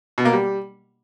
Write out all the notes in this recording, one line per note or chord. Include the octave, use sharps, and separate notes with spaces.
B2
A#3
G3